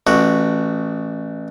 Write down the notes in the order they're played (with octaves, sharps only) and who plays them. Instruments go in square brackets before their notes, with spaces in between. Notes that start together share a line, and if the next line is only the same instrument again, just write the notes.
[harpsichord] A1 F#4